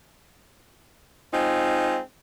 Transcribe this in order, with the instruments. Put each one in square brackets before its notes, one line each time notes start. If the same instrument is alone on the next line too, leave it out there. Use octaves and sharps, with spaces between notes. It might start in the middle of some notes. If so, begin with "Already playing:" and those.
[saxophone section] G#3 C4 D#4 F4